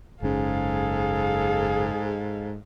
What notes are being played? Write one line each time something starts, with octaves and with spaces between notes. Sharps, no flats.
F#1 G#2 C#4 G#4 A4 F5